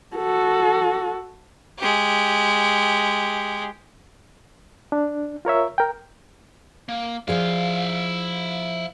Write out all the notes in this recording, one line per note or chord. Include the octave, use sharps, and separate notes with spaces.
F#4 A4
G#3 G4
D4
F4 A#4 C#5 E5
A#4 G5
A#3
F3 E4 G#4 D5 F5